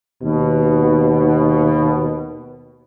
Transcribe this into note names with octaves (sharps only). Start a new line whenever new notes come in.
D#2 B2